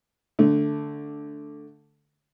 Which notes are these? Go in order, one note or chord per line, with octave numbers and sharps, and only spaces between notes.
D3 A3